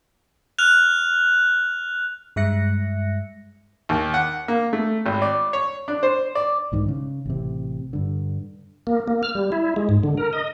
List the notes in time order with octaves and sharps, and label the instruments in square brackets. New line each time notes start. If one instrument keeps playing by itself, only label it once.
[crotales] F6 F#6 F7
[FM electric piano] G2 G#3 E5 F#6 A#6 C#7
[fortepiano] D#2
F#5
A#3
A3
G#1
D5
C#5
D4
C5
D5
[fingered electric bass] B1 G#2 D#3
C#3
A1 C3
G2 D3
[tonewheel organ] A#3
A#3
F6
G3
E4
G#3
G#2
D3
A#4
D#5